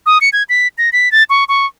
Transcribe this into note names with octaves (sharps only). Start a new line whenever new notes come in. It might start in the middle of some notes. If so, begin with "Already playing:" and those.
D#6
C#7
G#6
B6
A#6
B6
A6
C#6
C#6